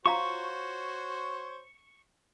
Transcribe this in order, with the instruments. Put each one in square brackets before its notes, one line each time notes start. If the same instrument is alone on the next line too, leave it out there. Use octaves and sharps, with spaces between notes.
[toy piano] F4 F5 A#5 [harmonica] F#4 C5 C#5 [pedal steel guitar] C#6